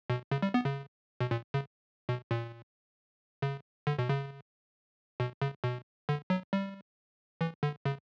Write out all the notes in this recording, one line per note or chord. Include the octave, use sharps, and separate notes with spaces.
B2
C#3
G3
B3
C#3
B2
A#2
C#3
B2
A#2
C#3
D3
B2
C#3
B2
C#3
B2
D3
F#3
G3
E3
D3
C#3